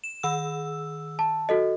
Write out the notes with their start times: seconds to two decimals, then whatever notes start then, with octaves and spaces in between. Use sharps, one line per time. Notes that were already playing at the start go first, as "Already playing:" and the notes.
0.04 E7
0.23 D#3 E6
1.19 A5
1.49 F#4 A4 D#5